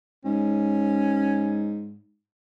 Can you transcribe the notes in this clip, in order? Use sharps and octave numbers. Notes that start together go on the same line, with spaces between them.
G#2 C#4